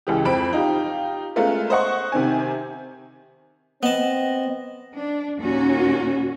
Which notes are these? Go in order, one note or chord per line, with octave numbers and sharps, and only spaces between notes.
C#2 E3 G4
F2 C4 B5 D7
D#4 F4 G4
G#3 A3 B3 C#4 F4 A#4
C5 D#5 F#5 C#6
C3 D#3 C4 G#5
B3 C4 D#5 A5
D4
D#2 A#2 C#4 F#4